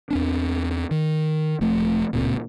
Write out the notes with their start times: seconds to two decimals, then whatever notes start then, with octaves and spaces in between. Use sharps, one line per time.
0.11 E2 C4 D4
0.91 D#3
1.61 E1 F3 A3
2.13 D1 C#2 A#2 C4